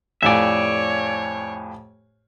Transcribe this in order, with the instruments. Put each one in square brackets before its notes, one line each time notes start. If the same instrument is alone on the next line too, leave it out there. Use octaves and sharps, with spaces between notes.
[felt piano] F2 A2 [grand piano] G4 F5 G#5 [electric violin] C#5 [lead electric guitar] D5 E5